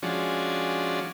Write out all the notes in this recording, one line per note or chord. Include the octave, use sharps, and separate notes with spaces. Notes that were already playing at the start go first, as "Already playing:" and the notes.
F3 G#3 C#4 D4 F#4